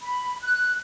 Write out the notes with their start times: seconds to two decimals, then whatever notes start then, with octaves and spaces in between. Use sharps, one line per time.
0.02 B5
0.41 F#6